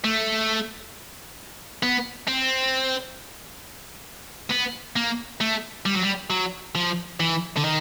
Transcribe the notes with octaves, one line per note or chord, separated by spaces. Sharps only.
A3
B3
C4
B3
A#3
A3
G3
F#3
G3
F#3
F3
E3
D3
D#3